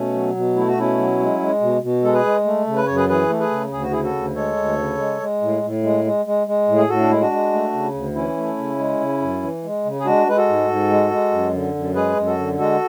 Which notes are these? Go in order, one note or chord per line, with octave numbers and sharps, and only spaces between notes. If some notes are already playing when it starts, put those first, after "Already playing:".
Already playing: B2 A3 C#4
F#3
B2
A3 E4
F#4
B2 C#4 E4
F#3
G#3
G#3
B2
B2
G#3 A4
G#4 B4
G#3
A3
C#3
B4
F#2 C#5
G#4 B4
E3 G#4 B4
A3
G#4 B4
C#3
D2 G#4
F#4
C#3 E4 G#4
F#4 A4
D2
G#3 A4 C#5
D2
C#3
G#3
G#3
A2
A2
G#3
G#3
G#3
G#3
A2
G#4
A2 F#4 A4
D4
G#3 E4
D4 F#4
G#3
A3
C#3
D2
E3 C#4 E4
A3
C#3
G#3
C#3
F#2
E3
G#3
C#3
G#4
G#3 D4 F#4
G#3 B4
F#4 A4
G#2
G#2
G#3
G#3
F#2
D3
F#2
G#3 G#4 B4
F#2
F#4 A4
D3
G#3 F#4 A4